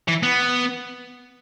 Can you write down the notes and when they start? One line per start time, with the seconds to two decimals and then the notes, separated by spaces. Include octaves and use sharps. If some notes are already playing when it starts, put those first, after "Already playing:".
0.08 E3
0.23 B3